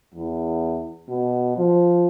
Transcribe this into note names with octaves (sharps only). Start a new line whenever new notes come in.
E2
B2
F3